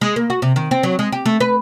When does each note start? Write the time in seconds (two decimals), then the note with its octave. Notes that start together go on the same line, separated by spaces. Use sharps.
0.01 G#3
0.16 A#3
0.30 F#4
0.42 C3
0.56 D#3
0.71 C4
0.83 F#3
0.99 G#3
1.12 G4
1.26 A3
1.40 B4